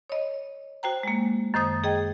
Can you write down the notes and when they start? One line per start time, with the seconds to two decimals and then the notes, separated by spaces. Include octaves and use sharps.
0.10 C#5 D#5
0.83 F#4 C5 G5 A#5
1.03 G#3 A#3
1.54 F#2 D#3 C5 D#6 A6
1.84 G#4 D#5 G5